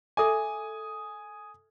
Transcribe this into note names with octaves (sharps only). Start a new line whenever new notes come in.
A4 E5 G#5 D6 D#6